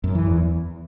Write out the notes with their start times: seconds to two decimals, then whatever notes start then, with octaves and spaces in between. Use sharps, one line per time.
0.04 F#2
0.15 E3
0.26 E2